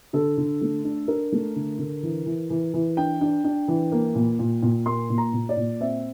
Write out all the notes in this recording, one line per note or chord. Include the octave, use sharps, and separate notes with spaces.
D3 A4
D3
A3
D4
D4 A#4
A3
D3
D3
E3
E3
E3
E3
D4 G5
D4
D4
E3
A#3
A#2
A#2
A#2
A#3 C6
A#2
A#5
A#2
D5
A#2
C4 E5